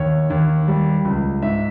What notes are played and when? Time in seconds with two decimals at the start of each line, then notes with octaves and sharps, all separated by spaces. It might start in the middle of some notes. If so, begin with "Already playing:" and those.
Already playing: D#2 C#5
0.30 D#2
0.68 G3
1.05 C#2
1.42 G#2 E5